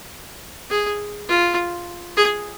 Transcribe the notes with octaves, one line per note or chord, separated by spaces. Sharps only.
G#4
F4
G#4